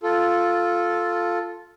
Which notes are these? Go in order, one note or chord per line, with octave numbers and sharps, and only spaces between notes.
F4 A4